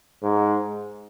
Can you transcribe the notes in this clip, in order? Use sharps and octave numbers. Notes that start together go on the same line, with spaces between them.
G#2